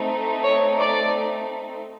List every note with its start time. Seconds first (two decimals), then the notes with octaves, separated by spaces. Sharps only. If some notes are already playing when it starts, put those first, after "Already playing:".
Already playing: A3 C4 D#4
0.43 C#5
0.77 D5